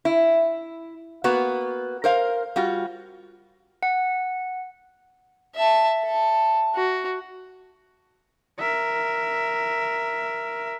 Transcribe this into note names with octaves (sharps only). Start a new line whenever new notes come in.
E4
A#3 B3 F#4 B4
A#4 C5 F5
G3 F4 F#4
F#5
E5 A5
A4
F#4
A#4 E5